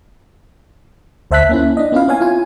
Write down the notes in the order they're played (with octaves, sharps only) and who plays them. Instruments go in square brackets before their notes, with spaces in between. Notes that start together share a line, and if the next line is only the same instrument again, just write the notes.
[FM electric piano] D2 C5 E5 A5 F#6 B6
A#3 C#4 E4
D4 D#5
B3 C#4 E4 F4 B4 F5
C4 C#5 F5 G#5
E4 F4 G#5